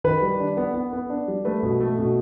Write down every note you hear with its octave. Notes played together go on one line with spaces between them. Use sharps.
D#3 B4
G3
D4
B3
B3
B3
D4
G3
A3 B4
B2
A3
B2